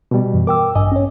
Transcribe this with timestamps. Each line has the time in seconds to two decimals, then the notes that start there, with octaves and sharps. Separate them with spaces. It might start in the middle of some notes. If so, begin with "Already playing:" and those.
0.11 B2 G3
0.33 F#2 E3
0.47 A#4 G5 D6 E6
0.75 A1 G2 D#5 G#5
0.92 C#4 C#5